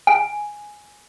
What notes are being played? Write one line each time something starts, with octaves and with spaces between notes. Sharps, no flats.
G#5